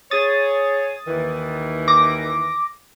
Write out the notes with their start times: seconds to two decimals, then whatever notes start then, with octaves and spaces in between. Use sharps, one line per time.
0.11 G#4 C#5 D#6 A6
1.08 D#2 D#3 E3
1.88 D6 A#6